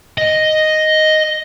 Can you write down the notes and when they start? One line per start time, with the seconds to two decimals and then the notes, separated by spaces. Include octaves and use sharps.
0.18 D#5